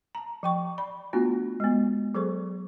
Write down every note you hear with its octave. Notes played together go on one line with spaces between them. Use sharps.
A5 A#5
F3 G5 C#6
D5 B5
A3 B3 D4 F4 F#4
G#3 B3
F#3 G#4 A4 C5 C#6